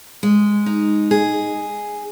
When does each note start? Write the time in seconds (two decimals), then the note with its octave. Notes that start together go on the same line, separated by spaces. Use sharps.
0.23 G#3
0.66 D#4
1.11 G#4